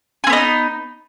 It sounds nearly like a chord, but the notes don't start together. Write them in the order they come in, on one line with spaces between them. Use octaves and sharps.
G#4 C4 B3 D#4